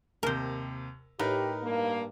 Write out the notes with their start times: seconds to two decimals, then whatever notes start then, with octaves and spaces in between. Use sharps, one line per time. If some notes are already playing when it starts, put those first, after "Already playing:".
0.23 D#2 C3 A#4 C5
1.19 A2 D#4 G4 A#4 B4
1.63 G2 A#3